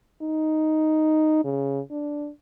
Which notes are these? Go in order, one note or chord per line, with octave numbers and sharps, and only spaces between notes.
D#4
C#3
D4